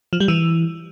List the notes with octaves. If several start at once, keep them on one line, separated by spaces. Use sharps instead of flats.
F3
G3
E3